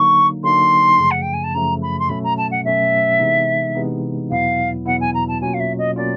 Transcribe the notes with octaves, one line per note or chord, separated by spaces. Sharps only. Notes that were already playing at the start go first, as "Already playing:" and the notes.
Already playing: D3 F#3 A#3 D#4 C#6
D3 F#3 A#3 D#4 C6
F#2 C#3 F3 A3
F#5
G5
G#5
A5
F#2 C#3 F3 A3 A#5
B5
C6
B2 F#3 A3 C#4 B5
A#5
A5
F#5
B2 F#3 A3 C#4 E5
C3 E3 G#3 B3 D#4
C3 E3 G#3 B3 D#4
E2 B2 F#3 B3 E4 F5
E2 B2 F#3 B3 E4 F#5
G#5
A#5
A5
B2 F#3 A#3 C#4 F4 G#5
F5
E5
D#5
B2 F#3 A#3 C#4 F4 D5